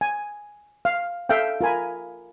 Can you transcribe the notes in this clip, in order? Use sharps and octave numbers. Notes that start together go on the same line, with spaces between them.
G#5
F5
A4 E5 F5 G5
F4 A#4 G#5 B5